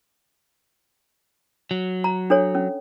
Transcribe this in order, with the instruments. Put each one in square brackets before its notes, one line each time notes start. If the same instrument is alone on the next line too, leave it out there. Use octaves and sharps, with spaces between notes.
[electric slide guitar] F#3
[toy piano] A#5
D4 A4 C#5
C#4